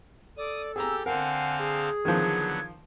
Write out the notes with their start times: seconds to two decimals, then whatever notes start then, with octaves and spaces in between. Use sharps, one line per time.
0.37 A4 D5 D#6
0.76 G4 G#4 G#5 A#5 E6
1.06 D3 C4 A#4 F5 F#5 G#5
1.60 G#4
2.05 D3 D#3 F3 F#3 B3 G#6